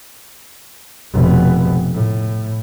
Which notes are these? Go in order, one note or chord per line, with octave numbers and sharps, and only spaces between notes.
F1 B2
A2